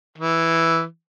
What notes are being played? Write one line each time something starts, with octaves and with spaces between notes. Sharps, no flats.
E3